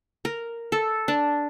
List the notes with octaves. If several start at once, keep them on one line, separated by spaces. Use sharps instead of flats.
A#4
A4
D4